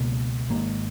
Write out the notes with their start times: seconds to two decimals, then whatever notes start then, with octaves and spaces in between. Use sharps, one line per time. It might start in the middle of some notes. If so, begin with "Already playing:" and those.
Already playing: C#2 B2 A#3
0.50 G#1 G#2 A#3